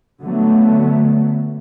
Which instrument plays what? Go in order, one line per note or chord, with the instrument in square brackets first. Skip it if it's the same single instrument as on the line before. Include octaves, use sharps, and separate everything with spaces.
[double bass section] D3 F#3 A3 B3